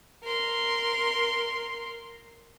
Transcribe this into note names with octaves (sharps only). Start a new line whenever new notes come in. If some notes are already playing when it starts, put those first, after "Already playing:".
A#4 C6